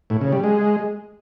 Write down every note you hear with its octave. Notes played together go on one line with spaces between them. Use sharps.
A2
C#3
G3
G#3